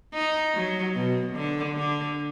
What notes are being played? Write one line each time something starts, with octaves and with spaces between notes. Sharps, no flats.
D#4
F#3
B2
D3
D3